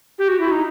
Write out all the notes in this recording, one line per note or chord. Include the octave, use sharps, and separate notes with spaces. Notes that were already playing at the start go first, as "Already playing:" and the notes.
G4
F#4
E4
D#4